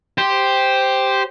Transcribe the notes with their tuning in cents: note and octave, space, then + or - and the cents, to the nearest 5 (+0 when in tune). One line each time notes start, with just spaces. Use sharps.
G4 +0 C5 +0